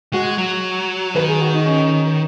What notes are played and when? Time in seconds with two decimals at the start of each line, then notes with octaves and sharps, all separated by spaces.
0.13 G#3 F#4
0.38 F#3
1.15 D#3 B4
1.28 G#4
1.41 F#4
1.53 D#4
1.66 C#4